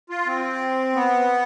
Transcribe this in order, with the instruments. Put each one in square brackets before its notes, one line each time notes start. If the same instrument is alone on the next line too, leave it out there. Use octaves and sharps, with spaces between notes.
[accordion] F4
C4
B3